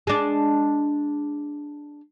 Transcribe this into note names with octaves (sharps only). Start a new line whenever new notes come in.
G#3 D4